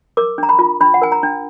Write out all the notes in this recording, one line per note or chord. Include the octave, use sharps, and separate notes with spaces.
A#4 D6
D4 A#5
B5
F4
D4 B5
F#5
A#4 G#5
A#5
D4